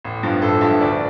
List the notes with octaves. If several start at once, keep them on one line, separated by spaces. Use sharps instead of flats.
A1
G2 F3
A1 A4
G2 F3 E5
D2 D5